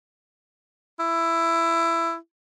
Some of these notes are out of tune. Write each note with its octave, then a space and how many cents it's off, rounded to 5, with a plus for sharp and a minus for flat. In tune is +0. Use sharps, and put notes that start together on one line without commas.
E4 +15